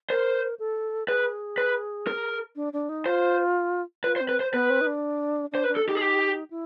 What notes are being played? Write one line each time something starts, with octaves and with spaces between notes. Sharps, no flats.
A#4 C5
A4
G#4 B4
B4
A#4
D4
D4
D#4
F4 C5
F4 B4
C5
C4
B4
C5
B3 B4
C4
D#4
D4
D4 C5
B4
D4
A4
D#4 G4
G#4
G4
E4